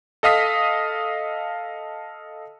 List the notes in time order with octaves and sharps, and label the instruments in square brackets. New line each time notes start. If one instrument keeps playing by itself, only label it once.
[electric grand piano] A4 D#5 F5 D#6 B6